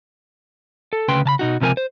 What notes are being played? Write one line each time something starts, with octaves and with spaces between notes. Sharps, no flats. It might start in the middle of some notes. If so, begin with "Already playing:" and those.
A4
D2 C#3 B4 G5 C6
C#3 A5 B5
B2 D#4 F#4
C#2 C3 F3 A4 A#4 G#5
C5